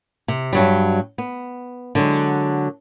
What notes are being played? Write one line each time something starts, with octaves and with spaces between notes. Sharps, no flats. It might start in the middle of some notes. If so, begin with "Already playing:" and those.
C3
G2 F#3 G3
B3
D3 F#3 G#3